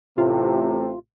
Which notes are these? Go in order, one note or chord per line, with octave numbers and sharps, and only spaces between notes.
A1 A2 C3 F4